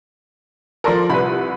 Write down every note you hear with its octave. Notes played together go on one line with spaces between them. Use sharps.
F3 A4 A#4 D5 C6
C2 B4 B5